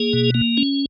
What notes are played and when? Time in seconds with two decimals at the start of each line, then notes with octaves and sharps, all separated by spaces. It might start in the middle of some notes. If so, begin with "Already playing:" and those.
Already playing: A#3 G#4
0.13 B2
0.34 A#3
0.57 C#4